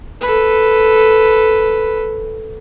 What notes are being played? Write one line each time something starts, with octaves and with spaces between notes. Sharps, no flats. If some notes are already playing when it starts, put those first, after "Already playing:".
A4 B4